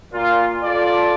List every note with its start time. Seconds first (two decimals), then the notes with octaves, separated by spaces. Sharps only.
0.13 A#2 F4
0.63 F4 A4 D5